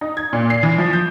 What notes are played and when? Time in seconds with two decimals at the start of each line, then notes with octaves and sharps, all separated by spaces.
0.01 D#4
0.17 G#6
0.33 A#2
0.50 C7
0.63 E3
0.78 F3
0.93 G6